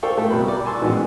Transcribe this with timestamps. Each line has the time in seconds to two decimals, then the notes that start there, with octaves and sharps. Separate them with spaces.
0.03 A4 C5 D5 F5 G5 C#6
0.17 A3 A4 G5
0.30 C2 B2 G3 A#4 B4 B5
0.48 D5
0.66 G#5 A5 C6 C#6 E6
0.82 A1 G#2 E3 B3 F#4